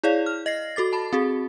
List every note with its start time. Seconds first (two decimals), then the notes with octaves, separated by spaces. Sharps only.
0.04 E4 G#4 C#5 D5 F5
0.26 F6
0.46 D#5 A#6 C7
0.76 F#4 A4 D6 A6
0.93 A5 B5
1.13 C4 F#4 G#4